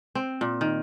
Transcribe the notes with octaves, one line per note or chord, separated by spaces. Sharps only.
C4
A#2
D#3